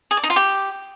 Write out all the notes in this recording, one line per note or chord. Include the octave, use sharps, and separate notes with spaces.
G#4
D5
D#4
F4
G4